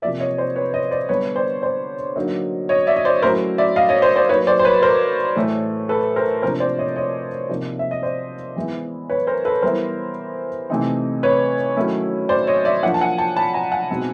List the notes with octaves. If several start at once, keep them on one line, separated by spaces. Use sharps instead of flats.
C3 F3 A#3 D5 E5
C#5 D#5
C5 D5
B4 C#5
C#5 D#5
C5 D5
D3 G3 B3 D4 B4 C#5
C5 D5
C5 D5
D3 F#3 A#3 D#4
C#5 D#5
D5 E5
D#5
C5 D5
F#3 A3 C#4 E4 A#4 C5
D5 E5
D#5 F5
C#5 D#5
C5 D5
C5 D5
F#3 A#3 D#4 B4 C#5
C5 D5
C5
B4 C#5
A#4 C5
A2 E3 A3
A4 B4
A#4 C5
C3 F3 A#3 D4 A#4 C5
C5 D5
C#5 D#5
C#5 D#5
C3 F3 A#3 D#4
E5
D#5
C5 D5
E3 G#3 B3 E4
B4 C#5
A#4 C5
A4 B4
E3 G3 B3 E4 A#4 C5
C3 E3 A3 C4 D#4
B4 C#5
D#3 F#3 A3 C#4 E4
C5 D5
C#5 D#5
D5 E5
F3 A#3 D4 E5 F#5
A5
F#5 G#5
G5 A5
A5 B5
G#5 A#5
F#5 G#5
B2 G#3 C4 D#4